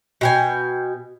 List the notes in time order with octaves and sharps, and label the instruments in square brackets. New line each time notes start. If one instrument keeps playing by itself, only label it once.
[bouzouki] B2 G5 G#5